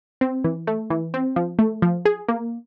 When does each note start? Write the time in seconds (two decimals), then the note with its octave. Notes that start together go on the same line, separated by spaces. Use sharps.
0.21 C4
0.44 E3
0.67 A3
0.90 E3
1.14 C4
1.36 F3
1.59 A3
1.82 F3
2.05 G#4
2.28 A#3